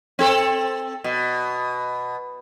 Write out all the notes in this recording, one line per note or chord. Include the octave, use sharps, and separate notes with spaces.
C4 A4
B2